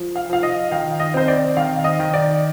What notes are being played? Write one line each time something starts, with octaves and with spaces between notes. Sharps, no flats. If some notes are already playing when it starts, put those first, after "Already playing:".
Already playing: F3
F5
F3 F5
D#5
D#3 F5
D#5
C4 C5
D5
D#3 F5
D#5
D#3
D5